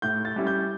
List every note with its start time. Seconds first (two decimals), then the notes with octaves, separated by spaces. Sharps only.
0.02 A2 G6
0.25 A6
0.36 G3 C#4 E4
0.47 G6